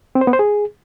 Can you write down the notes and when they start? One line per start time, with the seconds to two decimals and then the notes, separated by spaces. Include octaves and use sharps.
0.15 C4
0.21 C5
0.27 B3
0.33 C5
0.39 G#4